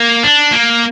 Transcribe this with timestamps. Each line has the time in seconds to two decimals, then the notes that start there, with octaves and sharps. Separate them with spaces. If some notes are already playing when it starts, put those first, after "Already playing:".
Already playing: A#3
0.23 D4
0.52 A#3